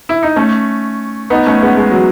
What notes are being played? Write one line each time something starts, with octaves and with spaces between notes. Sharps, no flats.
E4
D#4
A3 C#4
B3 D#4
A3 C#4
G#3 B3
G#3
F#3